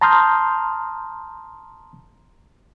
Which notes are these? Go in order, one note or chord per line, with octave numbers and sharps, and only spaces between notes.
A5 A#5 C6 D#6 F6 G6